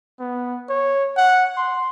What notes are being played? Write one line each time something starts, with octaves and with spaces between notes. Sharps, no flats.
B3
C#5
F#5
C6